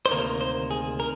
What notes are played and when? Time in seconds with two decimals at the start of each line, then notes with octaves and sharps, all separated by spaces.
0.06 C5
0.10 D2 C3 D#3 A#3 A#4
0.41 C5
0.71 G#4
1.00 A#4